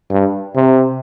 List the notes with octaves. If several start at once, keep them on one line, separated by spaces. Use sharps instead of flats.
G2
C3